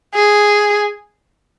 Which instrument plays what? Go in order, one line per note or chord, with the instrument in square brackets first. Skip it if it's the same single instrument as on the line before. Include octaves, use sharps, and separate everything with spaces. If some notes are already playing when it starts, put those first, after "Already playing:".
[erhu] G#4